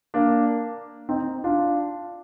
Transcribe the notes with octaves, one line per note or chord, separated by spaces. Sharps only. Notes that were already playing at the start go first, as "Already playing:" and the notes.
A#3 D4
C4 D#4
D4 F4